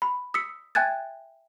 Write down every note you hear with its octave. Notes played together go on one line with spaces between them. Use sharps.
B5
D#6 E6 B6 C#7
E5 G5 G#5 F#6 G#6 A6